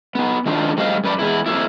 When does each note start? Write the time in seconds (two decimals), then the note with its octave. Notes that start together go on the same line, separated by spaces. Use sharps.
0.15 B3 D#4
0.46 D#3 F3 D4
0.77 A2 F3 G3 D#5 F5
1.04 F#2 B4 D5
1.19 E2 G#3 E4
1.46 F2 C#3 A#3 E4